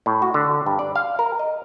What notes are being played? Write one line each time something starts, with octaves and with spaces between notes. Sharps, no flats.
A2
F#4
D3
G2
D5
F5
A#4
D#5